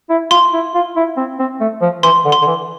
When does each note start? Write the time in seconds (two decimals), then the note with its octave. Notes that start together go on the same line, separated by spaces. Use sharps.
0.10 E4
0.31 F4 C6
0.53 E4
0.74 F4
0.96 E4
1.17 C4
1.39 C4
1.60 A3
1.82 F3
2.03 E3 C6
2.25 D3
2.32 C6
2.42 D3
2.47 E3